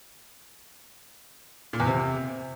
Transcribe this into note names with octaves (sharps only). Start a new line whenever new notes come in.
A#2
E2
C3